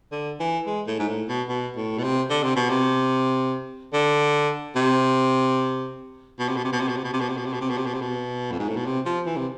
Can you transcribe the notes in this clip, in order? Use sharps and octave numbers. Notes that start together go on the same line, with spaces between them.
D3
E3
G#3
A2
G#2
A2
B2
B2
A2
B2
C3
D3
C3
B2
C3
D3
C3
B2
C3
B2
C3
B2
C3
B2
C3
B2
C3
B2
C3
B2
C3
B2
C3
B2
C3
B2
C3
B2
F2
G#2
A2
B2
C3
F3
E3
C3